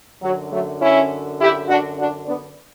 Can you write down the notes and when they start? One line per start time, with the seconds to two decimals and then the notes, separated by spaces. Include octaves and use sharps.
0.22 F#2 D3 F#3
0.51 F#3 A3
0.81 C#4 E4
1.39 E4 G4
1.68 D4 F#4
1.98 D4 F#4
2.26 B3 D4